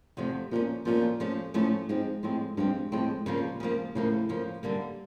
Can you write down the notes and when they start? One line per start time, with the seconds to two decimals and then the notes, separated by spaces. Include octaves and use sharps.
0.17 E2 C3 F3 A3
0.51 A#2 F3 A3 C#4
0.85 A#2 F3 A3 C#4
1.20 F3 A3 C#4
1.54 A2 F3 A3 C#4
1.89 G#2 F3 G#3 C4
2.23 A2 F3 G#3 C4
2.57 G2 F3 G#3 C4
2.92 A2 F3 G#3 C4
3.26 A#2 C#3 F3 A#3
3.60 C#3 F3 A#3
3.95 A2 C#3 F3 A#3
4.29 C#3 F3 A#3
4.63 F#2 D3 G3 A#3